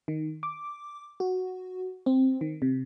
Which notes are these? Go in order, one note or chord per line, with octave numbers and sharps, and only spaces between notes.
D#3
D6
F#4
C4
D#3
C3